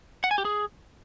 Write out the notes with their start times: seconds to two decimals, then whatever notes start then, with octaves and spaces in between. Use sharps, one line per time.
0.24 F#5
0.31 G#5
0.38 G4
0.45 G#4